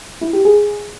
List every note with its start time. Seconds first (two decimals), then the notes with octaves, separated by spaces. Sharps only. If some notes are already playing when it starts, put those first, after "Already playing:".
0.21 E4
0.33 G4
0.45 G#4